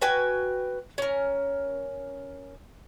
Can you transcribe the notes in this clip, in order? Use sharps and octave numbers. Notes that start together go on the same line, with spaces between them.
F#4 B4 G5 G#5
C#4 A#4